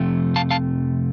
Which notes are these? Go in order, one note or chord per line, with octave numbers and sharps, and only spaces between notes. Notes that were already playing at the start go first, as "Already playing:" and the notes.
Already playing: F2 C3 F3 A3
F5 A5
F5 A5